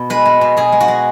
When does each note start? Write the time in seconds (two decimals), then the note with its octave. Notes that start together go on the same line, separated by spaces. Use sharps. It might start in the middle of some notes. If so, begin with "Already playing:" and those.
Already playing: B2
0.10 G#3 B4
0.25 G#3
0.41 B2
0.57 B2 G#4
0.72 G#3
0.80 F#4
0.88 G#3